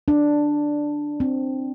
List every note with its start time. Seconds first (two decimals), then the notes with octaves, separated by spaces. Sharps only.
0.08 D4
1.20 C4